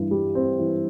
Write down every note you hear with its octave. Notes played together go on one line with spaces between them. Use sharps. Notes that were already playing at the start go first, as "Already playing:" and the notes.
Already playing: G2 E3
G3
C4
E3